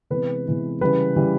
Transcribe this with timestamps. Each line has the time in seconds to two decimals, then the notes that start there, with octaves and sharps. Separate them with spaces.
0.10 C3 E3 G#3 B3 B4
0.46 C3 E3 G#3 B3
0.81 C#3 E3 G3 B4
1.16 C#3 E3 G3